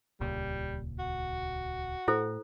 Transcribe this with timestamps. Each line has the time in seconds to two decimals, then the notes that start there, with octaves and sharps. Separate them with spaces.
0.20 D#1 C#2 A#2 G3
0.99 F#4
2.08 A2 E4 A4 C5